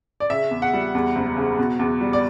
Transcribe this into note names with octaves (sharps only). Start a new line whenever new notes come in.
D5
C#3 E5
E2
F#5
G3
E2
F#1
C#3
B2
E2
G3
D5